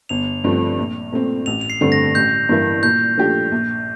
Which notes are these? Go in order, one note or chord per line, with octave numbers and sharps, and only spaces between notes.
G1 F7
G2 F3 A3 C4
A#1
A#2 A3 C4
A1 F7
F7
C7
G2 D3 A3 C4
A#6
A1 G6
G2 E3 A#3 E4
A#2 G6
F3 A3 D4 G4
A#1